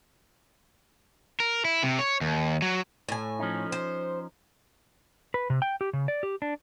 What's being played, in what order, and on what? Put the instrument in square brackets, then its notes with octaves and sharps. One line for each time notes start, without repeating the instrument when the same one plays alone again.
[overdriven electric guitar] A#4
E4
C3
C#5
D#2
F#3
[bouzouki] A2 G#5
[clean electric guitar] F3 C#4 D#4
[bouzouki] C5
[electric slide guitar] B4
C3
G5
G4
C#3
D5
G4
D4